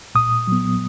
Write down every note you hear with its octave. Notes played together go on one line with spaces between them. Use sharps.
A#2 D#6
F#3 B3